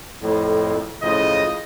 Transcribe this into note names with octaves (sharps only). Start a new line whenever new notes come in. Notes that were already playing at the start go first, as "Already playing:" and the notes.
F2 A2
A2 C#3 F3 D#5